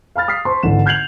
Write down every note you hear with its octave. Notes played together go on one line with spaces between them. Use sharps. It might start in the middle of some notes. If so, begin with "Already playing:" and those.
F5 B5 F6 A6
D#6 F6 B6 C7
C5 A5 C6 C#6
G#1 D3 E3 E7
F6 G6 G#6 C7 F7 F#7